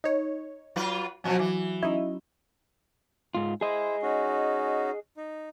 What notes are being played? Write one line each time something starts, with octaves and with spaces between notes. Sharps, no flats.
D#4 C#5
F#3 F4 B4
B2 F3 F#3 C#4 F#4
E3 D6
C#4 D#4 E4
G#2 F4
E4 G#4 C5 D#5
C#4 D#4 F#4
D#4